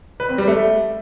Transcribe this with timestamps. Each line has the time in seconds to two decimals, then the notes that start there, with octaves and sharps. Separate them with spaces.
0.20 B4
0.29 C4
0.38 G3
0.48 A3